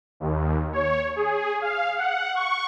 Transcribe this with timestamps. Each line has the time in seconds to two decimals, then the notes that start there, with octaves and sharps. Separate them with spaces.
0.20 D#2
0.73 C#5
1.16 G#4
1.62 F5
1.97 F#5
2.35 C#6